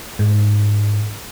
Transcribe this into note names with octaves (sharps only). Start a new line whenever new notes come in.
G#2